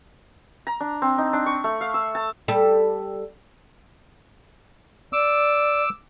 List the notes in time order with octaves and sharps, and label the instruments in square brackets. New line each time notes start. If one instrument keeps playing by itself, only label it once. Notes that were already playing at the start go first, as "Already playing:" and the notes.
[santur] A#5
D4
C4
D#4
D4
C#6
A3
F5
E6
A5
[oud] G3 A4
[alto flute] D5 [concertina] D6 E6